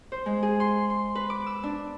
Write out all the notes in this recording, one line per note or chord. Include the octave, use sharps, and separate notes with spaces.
C5
G#3
G#4
C6
C6
B4
D6
E6
D4